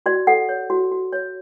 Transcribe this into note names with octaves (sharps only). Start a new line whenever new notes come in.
F#4 D5
A4 F#5
C#5
F#4
F#4
C#5